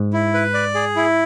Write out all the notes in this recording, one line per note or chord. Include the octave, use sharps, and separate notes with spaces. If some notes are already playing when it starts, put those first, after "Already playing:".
Already playing: G#2
E4
B4
D5
G#4
E4